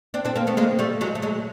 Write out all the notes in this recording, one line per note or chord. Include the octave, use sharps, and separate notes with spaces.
C4 D4
C4 D4
A#3 C4
A3 B3
G#3 A#3
G3 A3
F#3 G#3
A3
F#3 G#3